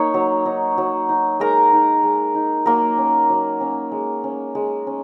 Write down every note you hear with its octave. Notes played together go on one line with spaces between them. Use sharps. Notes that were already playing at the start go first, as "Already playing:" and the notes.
Already playing: A#3 D#4 C#5 C#6
F#3
D#4
F#3
D#4
G#3 A#4 A#5
D#4
G#3
D#4
F#3 A#3 A#4
C#4
F#3
C#4
G#3
C#4
G#3
C#4